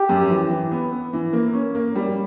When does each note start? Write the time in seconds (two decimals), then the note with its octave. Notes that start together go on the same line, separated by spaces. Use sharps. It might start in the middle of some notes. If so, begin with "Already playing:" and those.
Already playing: G4
0.09 F#2
0.30 E3
0.50 E3
0.72 B3
0.92 B3
1.13 E3
1.33 A#3
1.53 C#4
1.75 A#3
1.95 G3